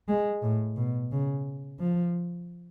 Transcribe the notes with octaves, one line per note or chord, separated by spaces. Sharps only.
G#3
A2
B2
C#3
F3